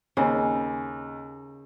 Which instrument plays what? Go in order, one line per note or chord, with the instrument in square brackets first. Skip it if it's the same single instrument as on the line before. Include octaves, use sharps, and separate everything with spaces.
[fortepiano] D#2 [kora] C#3